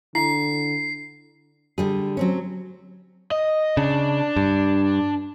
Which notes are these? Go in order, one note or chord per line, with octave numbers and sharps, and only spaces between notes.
D3 E4 C7
D3 G3 G#4
F#3 C4 C#4
D#5
C#3 D4
G2